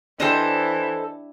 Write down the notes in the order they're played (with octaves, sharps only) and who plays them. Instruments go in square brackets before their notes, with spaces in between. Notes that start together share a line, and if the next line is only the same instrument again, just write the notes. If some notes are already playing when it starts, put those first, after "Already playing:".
[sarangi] E3 [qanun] D4 G4 E5 [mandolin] A4 C5 D#5